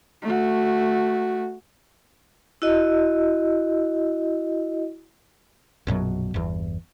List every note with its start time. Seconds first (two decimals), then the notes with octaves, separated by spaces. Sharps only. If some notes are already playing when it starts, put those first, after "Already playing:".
0.22 A3 F#4
2.62 E4 F#4 D#5
5.87 A#1 F#2 B2 F#3
6.34 G1 E2